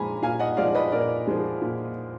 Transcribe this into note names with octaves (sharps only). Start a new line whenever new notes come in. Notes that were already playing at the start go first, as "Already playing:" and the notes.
Already playing: A#2 F3 G#3 G#5 A#5 B5
A#2 F5 G#5
D#5 F#5
F3 G#3 D5 F5
B4 D#5
A#2 A#4 D5
F3 G#3
A#2